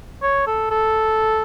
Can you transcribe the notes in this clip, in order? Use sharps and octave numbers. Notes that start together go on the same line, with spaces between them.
C#5
A4
A4